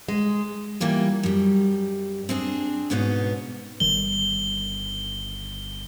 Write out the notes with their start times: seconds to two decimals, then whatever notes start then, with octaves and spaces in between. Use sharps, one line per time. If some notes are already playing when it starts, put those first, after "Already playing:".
0.08 G#3
0.80 E3 G3 A#3 F4
1.23 F#2 G3
2.29 C4 D4 G#4
2.90 G#2 B2 B3 C#4 D#4
3.80 G1 D#3 G3 G7